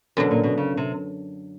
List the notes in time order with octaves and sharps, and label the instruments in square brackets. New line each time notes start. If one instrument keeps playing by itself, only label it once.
[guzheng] F#2 D3 F#3 [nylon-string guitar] B2
[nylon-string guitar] A#2
B2
C#3
C3